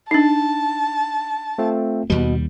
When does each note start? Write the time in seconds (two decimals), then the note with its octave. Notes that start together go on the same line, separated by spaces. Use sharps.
0.11 D4 D#4 A5
1.58 A3 C4 F4
2.10 D#2 B2 G3